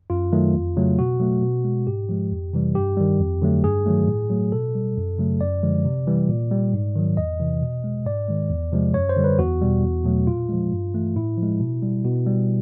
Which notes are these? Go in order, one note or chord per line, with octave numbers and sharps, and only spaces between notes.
F#2 F4
D#3 F#3 A3
F2
C#3 F#3 A3
B2 F#4
F#3 A3
B2
G#3
G#2 G4
F3 G#3
F2
C3 E3 G3
G2 G4
D#3 G3
F2
D3 F#3 A3
G2 G#4
D#3 F#3 A3
A2
F#3 A3
B2 A4
G3
F#2
C#3 F#3 A3
F#2 D5
D3 F3 G#3
C3
E3 G3
A#2
G3
G#2
D#3 F#3
E2 D#5
C3 E3
B2
G#3
G#2 D5
D#3 G#3
E2
C3 F3 G#3
F#2 C#5
C5
D3 G3
B4
E2 F#4
B2 G3
E2
B2 F#3 A3
A#2 F4
F3 G#3
G2
E3 A3
A2 E4
F3 G#3
B2
G3
B2
G3